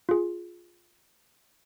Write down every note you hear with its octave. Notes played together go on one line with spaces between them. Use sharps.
F4 G#4